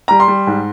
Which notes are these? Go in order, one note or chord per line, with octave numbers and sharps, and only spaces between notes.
G3 A#5
C6
G3
G#2